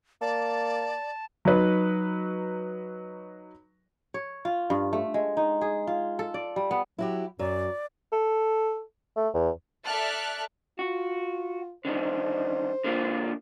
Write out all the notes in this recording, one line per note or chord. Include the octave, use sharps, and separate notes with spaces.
A#3 D5 A5
F#3 D#4 B4
C#5
F4
G2
A3
G#3
D#4
G#4
F4
A4
D5
G3
B3
F#3 E4 F#4 G4
F#2 F#3 D5
A4
A3
E2
A4 D5 E5 A5 F6 F#6
F4 F#4
D3 D#3 G3 C5
D3 A#3 F4